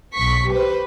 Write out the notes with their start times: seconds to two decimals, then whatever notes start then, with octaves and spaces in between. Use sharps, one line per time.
0.13 B1 C#6 B6
0.49 G4 B4 C5